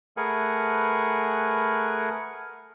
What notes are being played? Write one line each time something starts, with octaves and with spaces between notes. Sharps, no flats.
A3 G#4 A#4 B4 F#5 G#5